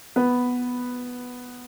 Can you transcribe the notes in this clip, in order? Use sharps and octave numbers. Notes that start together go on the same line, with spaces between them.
B3 B4